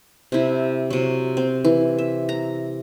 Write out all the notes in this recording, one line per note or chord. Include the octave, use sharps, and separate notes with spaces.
C3 E4
C3 F#3
C4
E3
E5
A#5